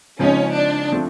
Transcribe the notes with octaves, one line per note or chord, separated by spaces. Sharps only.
C#3 F3 G#3 C4 C#4 D#4
D4
F3 A3 C4